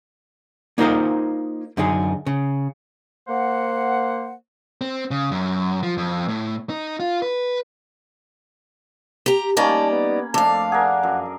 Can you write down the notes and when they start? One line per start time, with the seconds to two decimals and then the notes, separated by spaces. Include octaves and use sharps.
0.78 A#3 D#4 F4 A#4 C5 D#5
1.77 F#2 D3 D#4 G#4
2.26 C#3
3.28 A#3 C5 F#5
4.81 C4
5.11 C#3
5.31 F#2
5.83 F3
5.97 F2
6.28 A2
6.70 D#4
7.00 F4
7.22 B4
9.26 G4 A#5
9.57 G3 A#3 C#4 D#4 D5 A5 B5
9.91 B3
10.34 F2 A3 D4 D5 F5 A5
10.72 G#4 A#4 F#5
11.03 F#2